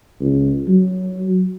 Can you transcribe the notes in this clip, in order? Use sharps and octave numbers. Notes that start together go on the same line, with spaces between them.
C#2
F#3